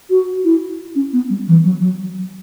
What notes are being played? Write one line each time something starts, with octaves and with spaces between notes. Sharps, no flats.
F#4
E4
C#4
B3
G3
E3
F#3
F#3